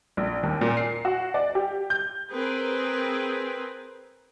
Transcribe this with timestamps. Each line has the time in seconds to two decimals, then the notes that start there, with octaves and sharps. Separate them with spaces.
0.17 A#1
0.43 D#2
0.61 A#2
0.77 C7
1.05 F#4
1.34 D5
1.55 G4
1.90 G6
2.31 C4 G#4 A#4 B4